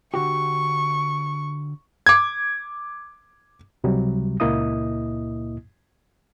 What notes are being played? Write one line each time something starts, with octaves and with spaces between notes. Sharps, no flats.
D3 F#4 G4 C#6
D6 G#6
C#2 C3 F#3 G3
C#2 A#2 A#3 E4 D#5 D#6